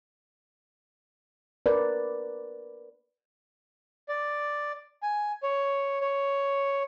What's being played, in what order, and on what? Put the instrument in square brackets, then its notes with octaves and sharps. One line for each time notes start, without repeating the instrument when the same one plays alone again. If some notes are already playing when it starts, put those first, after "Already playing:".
[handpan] A#4 B4 D5
[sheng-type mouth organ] D5
G#5
C#5
C#5